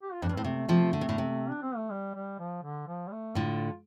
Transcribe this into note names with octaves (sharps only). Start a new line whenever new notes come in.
G4
F4
F2 D4
G2
A2 C4
C3 A3
C3 F3
D3
C3
A2 D3
C3
D4
C4
A3
G3
G3
F3
D3
F3
G3
A3
A2 D3 F4